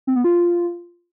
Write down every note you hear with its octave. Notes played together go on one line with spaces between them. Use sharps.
C4
B3
F4